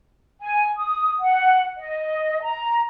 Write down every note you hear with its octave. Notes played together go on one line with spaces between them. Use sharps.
G#5
D#6
F#5
D#5
A#5